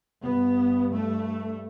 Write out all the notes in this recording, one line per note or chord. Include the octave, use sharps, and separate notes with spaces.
G2 B3
A3